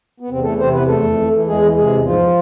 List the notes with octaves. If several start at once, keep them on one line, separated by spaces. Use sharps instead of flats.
B3
E2 C3 C4
E3 A3 A4
C3 C4 C5
E2 B3 B4
F2 A3 A4
F2
E3
E3
E2 G#3 G#4
E3
C3 G#3 G#4
E2
G#2 F3 F4